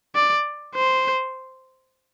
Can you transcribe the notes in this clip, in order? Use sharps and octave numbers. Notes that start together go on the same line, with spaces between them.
D5
C5